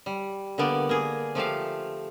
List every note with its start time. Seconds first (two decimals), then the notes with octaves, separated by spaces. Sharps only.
0.06 G3
0.58 D3 A#3 B3 D5
0.89 A#3 G#4
1.35 F3 A3 G4 F5